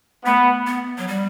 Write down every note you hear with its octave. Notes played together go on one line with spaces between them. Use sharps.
A3 B3
B3
F#3
G3